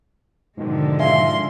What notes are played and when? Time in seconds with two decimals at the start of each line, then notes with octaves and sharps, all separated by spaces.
0.57 G#2 B2 D3 D#3 F3 G#3
0.99 E5 F5 G#5 C6